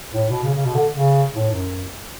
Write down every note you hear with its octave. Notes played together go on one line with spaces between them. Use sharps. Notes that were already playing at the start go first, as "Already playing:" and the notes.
A2
B2
C#3
C#3
B2
D3
C#3
A2
F#2